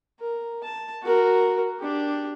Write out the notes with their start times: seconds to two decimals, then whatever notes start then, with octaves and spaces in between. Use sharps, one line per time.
0.20 A#4
0.64 A5
1.03 F#4 A#4
1.81 D4 G4